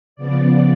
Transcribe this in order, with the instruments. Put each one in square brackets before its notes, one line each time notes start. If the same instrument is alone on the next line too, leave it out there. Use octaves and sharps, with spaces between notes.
[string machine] C#3 F3 B3 D5